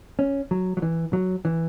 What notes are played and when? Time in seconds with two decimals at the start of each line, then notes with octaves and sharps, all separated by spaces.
0.19 C#4
0.51 F#3
0.77 F#3
0.82 E3
1.13 F#3
1.45 E3